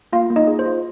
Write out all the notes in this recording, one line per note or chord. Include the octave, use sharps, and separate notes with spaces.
A#3 F4 F5
A#3
D#4 D#5
G#4
C5
F4